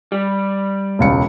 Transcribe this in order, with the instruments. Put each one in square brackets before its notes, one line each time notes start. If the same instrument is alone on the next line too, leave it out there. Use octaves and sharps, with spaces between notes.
[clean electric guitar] G3
[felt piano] E1 C#2 C#7